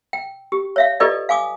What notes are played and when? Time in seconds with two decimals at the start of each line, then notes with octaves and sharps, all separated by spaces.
0.13 G5
0.52 G4
0.76 C#5 E5 F5
1.00 F4 G4 A4 B4 D5 D#5
1.29 F5 G#5 D6 D#6